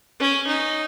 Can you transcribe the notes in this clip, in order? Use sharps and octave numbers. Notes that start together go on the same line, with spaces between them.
C#4
D#4